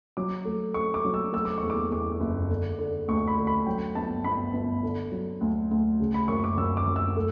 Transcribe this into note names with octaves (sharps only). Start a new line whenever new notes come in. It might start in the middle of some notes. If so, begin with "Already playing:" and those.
F#3 D6
A3
A3 C#6
D6
F#3
E6
A3 E6
D6
E2 C#6
D6
E2 D6
F#1
D3
D3
D2 C#6
B5
D3
B5
F#3 G5
G1 A5
G1 B5
G1
D3
F#3
D2
D2
C#3
B5
F#2 C#6
D6
F#2 E6
D6
F#2
E6
A3